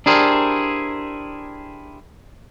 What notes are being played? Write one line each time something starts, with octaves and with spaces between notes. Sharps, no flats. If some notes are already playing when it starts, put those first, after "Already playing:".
D4 E4 G4 G#4 A#4 C5